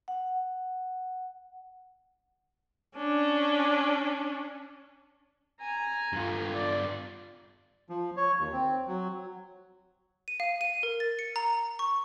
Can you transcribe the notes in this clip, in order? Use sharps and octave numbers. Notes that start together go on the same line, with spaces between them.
F#5
C#4 D4
G#5 A#5
G2 F4
D5
F3
C#5
D#2
C4
F#3
D#7
F5
D#7
A#4
A6
C#7
A#5
C#6